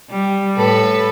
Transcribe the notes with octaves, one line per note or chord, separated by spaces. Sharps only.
G3
A2 A4 B4